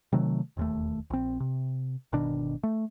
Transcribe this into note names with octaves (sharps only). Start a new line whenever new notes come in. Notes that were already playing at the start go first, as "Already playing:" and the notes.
C3 D#3 F#3 A3
E1 D#2 A3
A#1 C4
C3
G1 B2 D#3 D4
A3